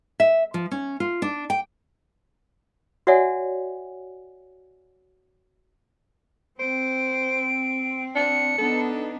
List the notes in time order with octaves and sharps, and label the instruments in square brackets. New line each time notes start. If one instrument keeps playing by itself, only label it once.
[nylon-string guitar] E5
F3
C#4
F4
D4
G5
[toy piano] F#4 C#5 D5 E5 F#5 G#5
[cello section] C4 [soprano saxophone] C5 [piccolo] D7
[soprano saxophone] D4 [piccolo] C#7
[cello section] B3 D4 D#4 [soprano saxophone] A4